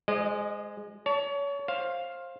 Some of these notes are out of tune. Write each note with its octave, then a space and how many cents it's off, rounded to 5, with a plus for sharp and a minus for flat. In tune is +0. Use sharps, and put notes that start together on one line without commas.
G#3 +0 C5 -10 D#5 -40
C#5 +30 A5 -5
C5 +25 F5 +0